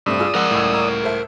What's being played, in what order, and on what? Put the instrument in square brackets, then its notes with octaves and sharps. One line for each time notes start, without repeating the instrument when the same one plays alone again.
[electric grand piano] G2 [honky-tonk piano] C3 A3 C4 [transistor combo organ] D5 D#6 E6
[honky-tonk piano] F4 G#4
[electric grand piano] F3 G#3 G#4 [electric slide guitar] A#4 F#5 [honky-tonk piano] F#6
[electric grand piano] C#2 A2
[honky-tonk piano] A#5
A4 C5 E5